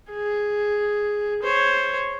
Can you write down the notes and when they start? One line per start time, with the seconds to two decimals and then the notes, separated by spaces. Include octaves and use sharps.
0.11 G#4
1.43 C5 C#5